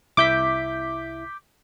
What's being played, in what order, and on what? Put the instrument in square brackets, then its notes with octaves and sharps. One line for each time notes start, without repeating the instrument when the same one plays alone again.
[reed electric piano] C2 E4 E5 [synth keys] D6 G6 B6